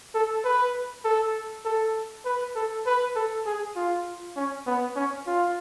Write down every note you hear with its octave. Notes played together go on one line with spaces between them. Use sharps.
A4
B4
A4
A4
B4
A4
B4
A4
G#4
F4
C#4
B3
C#4
F4